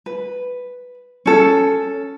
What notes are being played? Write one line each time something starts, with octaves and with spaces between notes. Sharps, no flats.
B4
C#4 A4